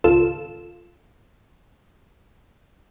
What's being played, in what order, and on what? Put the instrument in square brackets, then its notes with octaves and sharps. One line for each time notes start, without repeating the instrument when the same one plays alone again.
[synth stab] G#1 C#2 F4 A4 E7